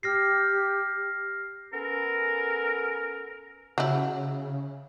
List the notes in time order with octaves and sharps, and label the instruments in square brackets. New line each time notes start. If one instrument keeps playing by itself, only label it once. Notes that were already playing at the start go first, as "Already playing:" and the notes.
[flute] G4 [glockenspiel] F6 A#6 C7
[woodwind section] B3 C#4 A4 A#4
[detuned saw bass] C#3 [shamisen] F#3 E4